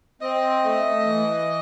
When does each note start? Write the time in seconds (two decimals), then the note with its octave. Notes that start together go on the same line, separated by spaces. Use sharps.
0.21 C4 D#5
0.64 A3
1.05 E3